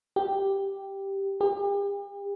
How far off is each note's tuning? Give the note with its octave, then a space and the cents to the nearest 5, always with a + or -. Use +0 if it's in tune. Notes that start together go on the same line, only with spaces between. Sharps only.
G4 +0
G4 +40